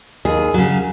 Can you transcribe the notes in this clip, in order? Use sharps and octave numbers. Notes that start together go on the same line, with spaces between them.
D#2 G#4
C#3 F#3